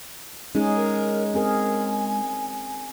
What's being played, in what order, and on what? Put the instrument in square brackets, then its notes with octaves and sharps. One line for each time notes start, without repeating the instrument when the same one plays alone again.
[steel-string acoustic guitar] G#3 [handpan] C#4 D#4 G#4
[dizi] A#4
[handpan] C4 G#4 A#4 [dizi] G#5